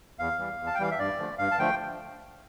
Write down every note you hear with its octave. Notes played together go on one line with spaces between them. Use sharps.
E2 F5
E3 G3
E2
A5
G5
E3 G3 F5
E5
G2 D5
D3 F3 A3
G2 F5
A5
D3 F3 A3 G5